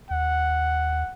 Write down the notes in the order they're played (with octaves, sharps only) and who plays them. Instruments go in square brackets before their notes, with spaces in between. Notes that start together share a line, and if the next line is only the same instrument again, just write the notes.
[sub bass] D#2 [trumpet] F#5